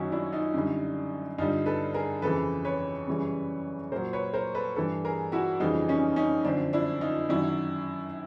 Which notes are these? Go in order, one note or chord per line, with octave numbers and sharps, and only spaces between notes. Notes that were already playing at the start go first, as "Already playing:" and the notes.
Already playing: F#2 D#3 F#3 C#4 D#4 E4 F#4
D4 E4
D#4 F4
F#2 D3 G3
G2 D3 G3 D#4 F4
A4 B4
G#4 A#4
F2 C#3 E3 A4 B4
B4 C#5
F#2 C#3 E3 G3
A#2 F#3 A#4 C5
B4 C#5
A#4 C5
A4 B4
G2 E3 G3 A4 B4
G#4 A#4
E4 F#4
F2 C#3 E3 G3 D#4 F4
C#4 D#4
C#4 D#4
F#2 D3 F3 C4 D4
D4 E4
D#4 F4
F#2 D#3 F#3 D4 E4